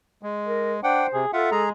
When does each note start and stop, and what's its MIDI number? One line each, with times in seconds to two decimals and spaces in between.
0.23 0.80 56
0.47 0.74 70
0.83 1.04 62
0.83 1.20 72
0.83 1.07 78
0.83 1.07 79
1.13 1.26 48
1.13 1.30 68
1.33 1.47 65
1.33 1.63 69
1.33 1.50 76
1.33 1.50 78
1.51 1.72 56
1.51 1.69 68
1.51 1.69 82